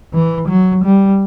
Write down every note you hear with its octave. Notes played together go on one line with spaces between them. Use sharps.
E3
F#3
G3